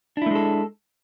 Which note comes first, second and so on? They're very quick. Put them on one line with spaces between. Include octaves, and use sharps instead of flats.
D4 E4 A3 G#3 A4